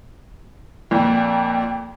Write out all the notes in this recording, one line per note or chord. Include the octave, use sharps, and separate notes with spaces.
F2 A#2 G5